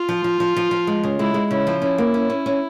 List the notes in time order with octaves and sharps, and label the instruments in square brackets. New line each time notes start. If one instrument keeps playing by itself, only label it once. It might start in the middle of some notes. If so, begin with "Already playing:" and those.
Already playing: [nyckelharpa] F4
[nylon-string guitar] F3
F3
F3
F3
F3
G#3
C#3
[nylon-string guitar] G#3 [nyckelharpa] E4
[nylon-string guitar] G#3
[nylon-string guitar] C#3 [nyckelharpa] E4
[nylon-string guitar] F3
[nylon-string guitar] C#4 [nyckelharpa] E4
[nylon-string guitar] A#3
C#4
C#4
C#4